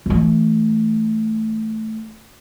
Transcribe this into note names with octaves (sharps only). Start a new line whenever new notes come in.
E3 A3